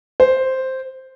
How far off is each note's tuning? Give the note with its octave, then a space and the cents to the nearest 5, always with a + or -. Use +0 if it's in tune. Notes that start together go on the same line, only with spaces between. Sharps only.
C5 +0